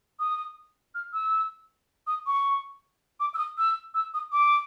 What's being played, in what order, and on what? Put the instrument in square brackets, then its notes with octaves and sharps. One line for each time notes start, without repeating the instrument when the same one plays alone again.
[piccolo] D#6
F6
E6
D#6
C#6
D6
E6
D#6
E6
E6
D#6
D6